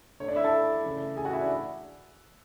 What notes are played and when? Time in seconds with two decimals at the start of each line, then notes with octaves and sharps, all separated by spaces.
0.20 D3 A3 C#5
0.28 D4 D5
0.36 E4 E5
0.44 A4 A5
0.84 C#3 E3 A3
1.16 G#4 G#5
1.25 F#4 F#5
1.33 E4 E5
1.41 D4 D5